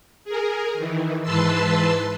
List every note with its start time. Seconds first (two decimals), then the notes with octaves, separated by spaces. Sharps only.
0.24 G#4 A#4
0.74 D#3 E3
1.22 G#2 E3 B4 A5 C6 E6